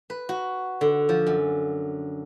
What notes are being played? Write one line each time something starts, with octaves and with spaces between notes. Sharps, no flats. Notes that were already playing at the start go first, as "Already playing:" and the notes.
B4
F#4
D3
F3
F#2